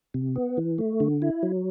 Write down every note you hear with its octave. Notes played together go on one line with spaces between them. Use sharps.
C3
B3
E3
A3
D3
E4
F#3